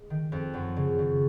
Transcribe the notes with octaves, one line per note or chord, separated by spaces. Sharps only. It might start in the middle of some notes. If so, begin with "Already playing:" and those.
Already playing: G#3
D#3
F2
F#2 F#3
C#3
C#3